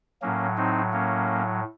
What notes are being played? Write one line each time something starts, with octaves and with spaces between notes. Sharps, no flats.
A2 F#3 A#3 C#4
C4 D#4
A#3 C#4